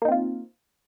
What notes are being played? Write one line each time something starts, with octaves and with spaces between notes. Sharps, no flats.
A#3 C4 D#4 F4